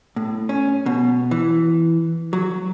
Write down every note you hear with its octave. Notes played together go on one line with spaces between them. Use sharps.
A2
C#4
B2
E3
F#3